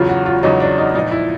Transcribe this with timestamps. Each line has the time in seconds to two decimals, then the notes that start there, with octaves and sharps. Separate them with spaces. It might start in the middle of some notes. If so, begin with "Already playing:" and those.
Already playing: E2 C#3 F#3 F4
0.09 F#4
0.26 F4
0.43 E2 C#3 F#3 D#4
0.60 D4
0.78 D#4
0.94 A#2 F3 D#4
1.12 E4